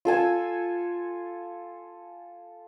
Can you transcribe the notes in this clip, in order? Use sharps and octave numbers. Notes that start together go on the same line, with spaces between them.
F4 A4 G#5 E6